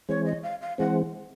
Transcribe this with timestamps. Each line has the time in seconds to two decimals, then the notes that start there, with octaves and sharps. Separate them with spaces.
0.09 E3 G#3 C4 C#5
0.26 D#5
0.43 F5
0.61 F5
0.78 E3 G#3 C4 F#5